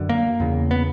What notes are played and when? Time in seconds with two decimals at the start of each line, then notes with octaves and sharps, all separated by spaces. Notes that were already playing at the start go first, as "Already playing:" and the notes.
Already playing: F#2 D3
0.09 A#3
0.40 E2 C#3
0.71 B3